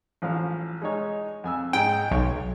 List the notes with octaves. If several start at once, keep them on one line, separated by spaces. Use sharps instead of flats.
A1 F3 F5
G#3 D#4 C#5
F2 G#5 E6
G#2 D#4 G5
B1 C#5